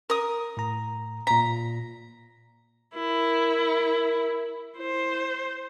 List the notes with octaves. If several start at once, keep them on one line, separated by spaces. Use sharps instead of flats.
A#4 D#6
A2 A#5
A#2 A#5 B6
E4 A#4
E4 C5